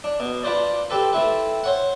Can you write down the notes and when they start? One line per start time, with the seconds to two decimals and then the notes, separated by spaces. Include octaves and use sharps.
0.04 D4
0.20 B2
0.43 D4 F4 B4 C5 D5
0.90 C4 G4 A4 B4
1.13 A3 C4 E4 B4
1.64 C5 C#5 F#5